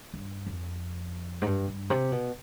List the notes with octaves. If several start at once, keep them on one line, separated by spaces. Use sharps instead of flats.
G2
F2
G#2
G2
G2
C3
B2